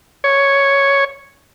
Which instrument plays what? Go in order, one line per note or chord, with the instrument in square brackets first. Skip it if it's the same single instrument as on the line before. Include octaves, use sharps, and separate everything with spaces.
[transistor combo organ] C#5